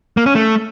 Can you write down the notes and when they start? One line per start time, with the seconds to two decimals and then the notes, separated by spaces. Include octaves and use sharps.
0.17 A#3
0.26 C#4
0.35 A3